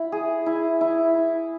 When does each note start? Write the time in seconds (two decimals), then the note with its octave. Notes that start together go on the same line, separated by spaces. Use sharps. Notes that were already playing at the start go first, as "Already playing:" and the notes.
Already playing: E4
0.12 G#4
0.46 E4
0.81 E4
1.14 E4